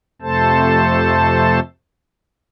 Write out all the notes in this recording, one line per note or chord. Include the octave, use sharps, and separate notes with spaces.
F2 C3 A3 A4 C5 A5